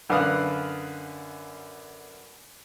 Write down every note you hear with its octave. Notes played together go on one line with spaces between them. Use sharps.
F#2 D3 B4 F5 D#6 F#6